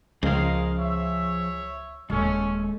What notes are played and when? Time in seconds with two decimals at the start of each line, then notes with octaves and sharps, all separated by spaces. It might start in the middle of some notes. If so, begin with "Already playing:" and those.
0.23 C#2 F3 G#4 A#4 C5 D#5 F5
0.78 C#5 E5
2.10 D#1 G#3 C#4 A4